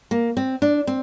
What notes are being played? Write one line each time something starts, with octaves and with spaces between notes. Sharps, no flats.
A#3
C4
D4
C4